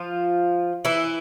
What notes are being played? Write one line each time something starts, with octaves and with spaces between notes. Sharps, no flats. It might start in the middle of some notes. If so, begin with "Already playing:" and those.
Already playing: F3 F4
E3 E4